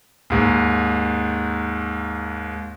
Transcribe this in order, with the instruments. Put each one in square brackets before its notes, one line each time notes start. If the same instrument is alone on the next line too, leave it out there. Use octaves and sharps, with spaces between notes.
[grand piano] D#2 G#2